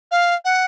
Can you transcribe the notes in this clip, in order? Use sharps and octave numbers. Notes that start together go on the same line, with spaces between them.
F5
F#5